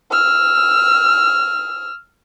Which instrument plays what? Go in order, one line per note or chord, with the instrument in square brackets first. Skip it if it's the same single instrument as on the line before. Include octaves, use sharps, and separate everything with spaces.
[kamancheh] E6 F6